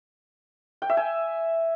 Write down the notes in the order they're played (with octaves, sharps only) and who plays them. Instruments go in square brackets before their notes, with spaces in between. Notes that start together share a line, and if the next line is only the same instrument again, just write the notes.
[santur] G5
E5
G#5